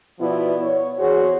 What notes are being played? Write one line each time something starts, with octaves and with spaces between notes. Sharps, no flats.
B2 F3 B3 E4 D5
C#5
E2 F#4 G#4 C5 C#5